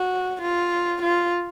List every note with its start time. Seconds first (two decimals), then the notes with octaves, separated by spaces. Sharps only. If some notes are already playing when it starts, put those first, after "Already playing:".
Already playing: F#4
0.42 F4
1.02 F4